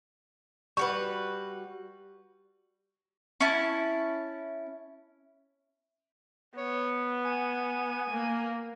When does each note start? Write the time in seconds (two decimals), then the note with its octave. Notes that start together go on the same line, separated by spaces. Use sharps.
0.77 G3 F#4 B4 C#6
3.40 C#4 E4 A5
6.57 B3 C#5
7.25 G#5
8.10 A#3